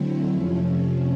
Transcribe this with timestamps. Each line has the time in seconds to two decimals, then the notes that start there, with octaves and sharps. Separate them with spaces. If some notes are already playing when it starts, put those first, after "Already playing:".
Already playing: D3 F#3 A3 C4 E4
0.30 F2 C3 F3 A3 C#4